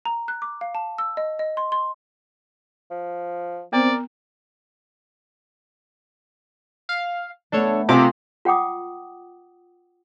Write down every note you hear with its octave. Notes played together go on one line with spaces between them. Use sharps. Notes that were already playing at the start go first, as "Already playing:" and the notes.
A#5
F#6
D6
F5
A5
E6
D#5
D#5
C6
C6
F3
B3 C4 A#4 D5
F5
A3 B3 D4 A4 C#5
C3 F4 G#4 G#5 D6
F4 F#5 G5 D6 D#6